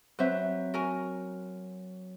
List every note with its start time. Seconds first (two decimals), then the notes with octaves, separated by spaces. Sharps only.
0.19 F#3 C4 B4 C5 E5
0.74 F#4 A#4 G#5